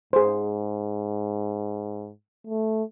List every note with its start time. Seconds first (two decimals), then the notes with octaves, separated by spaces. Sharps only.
0.13 G#2 G#4 C5
2.47 A3